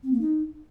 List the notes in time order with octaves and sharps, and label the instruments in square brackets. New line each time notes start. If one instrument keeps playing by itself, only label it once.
[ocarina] C4
A#3
D#4